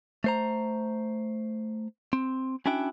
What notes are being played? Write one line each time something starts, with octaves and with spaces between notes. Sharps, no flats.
A3 C5 A#5
C4
C#4 D4 E4 F#4 G5